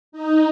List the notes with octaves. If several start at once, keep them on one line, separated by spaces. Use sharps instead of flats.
D#4